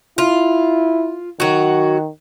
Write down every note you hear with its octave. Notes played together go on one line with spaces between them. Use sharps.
E4 F4
D#3 F#3 F#4